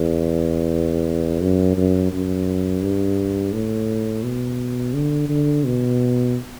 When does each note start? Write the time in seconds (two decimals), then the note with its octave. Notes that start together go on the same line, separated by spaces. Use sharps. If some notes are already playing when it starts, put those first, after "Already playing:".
Already playing: E2
1.42 F#2
1.77 F#2
2.12 F#2
2.82 G2
3.52 A2
4.23 B2
4.95 D3
5.29 D3
5.65 B2